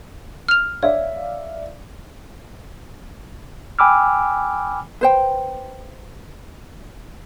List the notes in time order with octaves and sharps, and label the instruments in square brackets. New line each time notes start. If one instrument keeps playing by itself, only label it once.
[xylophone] F6 F7
[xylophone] C#5 [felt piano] D5 E5 F5
[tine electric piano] G5 G#5 B5 D6 E6 F6
[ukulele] B4 C5 G5